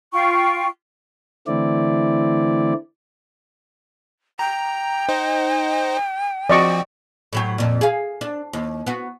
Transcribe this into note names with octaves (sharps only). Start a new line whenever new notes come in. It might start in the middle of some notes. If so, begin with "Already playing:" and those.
F4 G5 C#6
D3 E3 A3 C4 E4 D5
G5 A#5
D#4 C5 D#5
F3 C4 F#4 D5 D#5 C#6
A2 F#3 G4
F2 A#2
G#4 F5
D4
D#2
B3 F#4